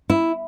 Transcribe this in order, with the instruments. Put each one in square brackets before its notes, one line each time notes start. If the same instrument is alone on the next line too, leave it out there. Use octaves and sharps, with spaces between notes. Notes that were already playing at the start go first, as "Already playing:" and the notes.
[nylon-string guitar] E4